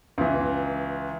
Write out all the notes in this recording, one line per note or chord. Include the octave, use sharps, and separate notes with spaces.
C#2 E3